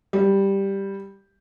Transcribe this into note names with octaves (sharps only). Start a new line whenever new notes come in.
G3